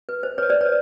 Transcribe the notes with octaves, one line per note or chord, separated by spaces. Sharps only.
B4
C5
B4 C#5
C5 D5
B4 C#5